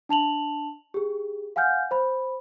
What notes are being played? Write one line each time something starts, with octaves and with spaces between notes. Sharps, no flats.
D4 A5 F7 F#7
G4 G#4
F5 F#5 G#5 F6 G6
C5 B5